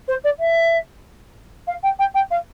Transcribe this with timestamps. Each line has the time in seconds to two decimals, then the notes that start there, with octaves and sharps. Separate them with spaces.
0.08 C5
0.24 D5
0.39 E5
1.67 F5
1.83 G5
1.99 G5
2.14 G5
2.31 F5